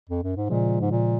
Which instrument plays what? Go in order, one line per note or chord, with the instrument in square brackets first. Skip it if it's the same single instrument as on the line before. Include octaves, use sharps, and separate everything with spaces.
[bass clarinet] F2
F#2
G#2
[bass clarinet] A#2 [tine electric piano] C#3 F3 G#3
[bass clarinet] G#2
A#2